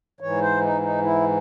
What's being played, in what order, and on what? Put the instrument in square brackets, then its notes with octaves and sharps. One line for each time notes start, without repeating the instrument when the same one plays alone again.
[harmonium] G#2 E3 C#5
C5
D#4
D#4
E4